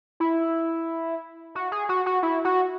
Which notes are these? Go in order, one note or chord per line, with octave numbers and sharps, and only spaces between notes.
E4
F#4
G#4
F#4
F#4
E4
F#4